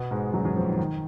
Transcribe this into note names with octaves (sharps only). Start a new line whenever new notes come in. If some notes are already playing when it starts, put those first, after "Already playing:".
Already playing: B2 B3
G#2 G#3
F#2 F#3
F#2 F#3
F2 F3
D#3
D#3